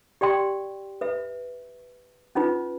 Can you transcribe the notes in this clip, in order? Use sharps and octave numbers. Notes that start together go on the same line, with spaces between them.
G4 D5 G5 C6
B4 E5
C#4 D#4 F4 B4